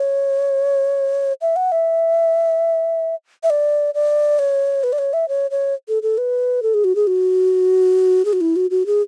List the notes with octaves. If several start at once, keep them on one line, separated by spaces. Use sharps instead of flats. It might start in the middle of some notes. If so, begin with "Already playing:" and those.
Already playing: C#5
E5
F#5
E5
E5
D5
D5
C#5
B4
D5
C#5
E5
C#5
C#5
A4
A4
B4
A4
G#4
F#4
G#4
F#4
G#4
F#4
E4
F#4
F#4
G#4